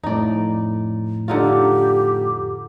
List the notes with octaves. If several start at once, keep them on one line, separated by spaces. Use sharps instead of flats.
F2 A2 D#4 D5
D3 D#4 F4 G4